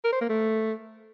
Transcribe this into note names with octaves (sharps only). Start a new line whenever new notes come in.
A#4
C5
A#3
A3